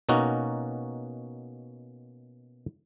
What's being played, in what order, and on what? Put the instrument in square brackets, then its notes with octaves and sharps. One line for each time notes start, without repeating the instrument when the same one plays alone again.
[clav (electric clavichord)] B2 A#3 C#4 D#4 F#4